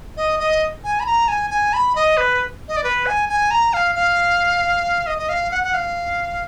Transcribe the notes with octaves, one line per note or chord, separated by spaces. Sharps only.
D#5
D#5
G#5
B5
A#5
G#5
G#5
B5
D#5
B4
D#5
D5
B4
G#5
G#5
A#5
F5
F5
D#5
D#5
F5
F#5
F#5
F5